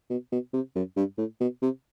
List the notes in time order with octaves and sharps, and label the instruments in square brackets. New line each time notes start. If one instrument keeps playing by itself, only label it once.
[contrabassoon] B2
B2
C3
F#2
G2
A2
B2
C3